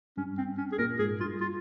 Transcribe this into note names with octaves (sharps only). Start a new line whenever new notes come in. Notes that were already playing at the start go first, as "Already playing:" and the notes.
G2 C#4
C4
C#4
G#4
A#2 A#4
G#2 G#4
G2 F4
F4